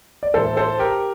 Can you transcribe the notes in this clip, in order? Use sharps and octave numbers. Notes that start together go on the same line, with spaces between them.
D5
A2 E3 A#3 A4 C5
A4 C5
G4 A#4